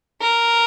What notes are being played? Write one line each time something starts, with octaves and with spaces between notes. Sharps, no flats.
A#4